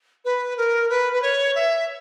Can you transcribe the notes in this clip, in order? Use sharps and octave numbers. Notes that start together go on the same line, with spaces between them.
B4
A#4
B4
B4
C#5
E5